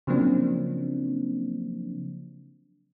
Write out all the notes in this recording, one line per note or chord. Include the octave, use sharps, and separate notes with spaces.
C#3 F3 F#3 A#3 C4 D4